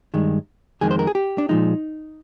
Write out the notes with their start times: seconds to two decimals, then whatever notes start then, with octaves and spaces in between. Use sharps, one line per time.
0.14 G2 D#3 G#3
0.81 F2 D#3 G#3 G#4
0.91 C5
0.99 A#4
1.07 G#4
1.15 G4
1.38 D4
1.49 A#2 F3 G#3 D#4